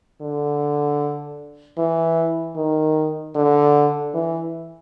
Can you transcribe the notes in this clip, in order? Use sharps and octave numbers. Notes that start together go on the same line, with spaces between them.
D3
E3
D#3
D3
E3